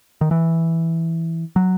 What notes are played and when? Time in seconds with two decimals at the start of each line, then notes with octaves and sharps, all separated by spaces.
0.21 D#3
0.31 E3
1.56 F#3